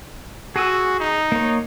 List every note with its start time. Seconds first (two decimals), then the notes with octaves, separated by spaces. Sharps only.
0.56 F#4 G#4 G#5 E6
1.00 D#4
1.32 A#3 C#5